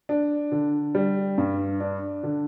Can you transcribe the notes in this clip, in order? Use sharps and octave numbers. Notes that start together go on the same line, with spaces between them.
D4
D3
G3
G2
D4
D3